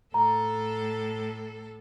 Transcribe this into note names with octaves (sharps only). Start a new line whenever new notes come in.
A2 A4 A#5